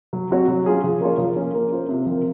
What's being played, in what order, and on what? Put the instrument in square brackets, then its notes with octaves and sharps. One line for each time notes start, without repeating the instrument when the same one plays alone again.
[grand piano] F#3
C4 F#4 C#5
F#3
C#4 F4 G#4
F3
A#3 F4 G#4 C#5
F3
A#3 C#4
A#3
F4 C5
C3
F3 C4 F4 A#4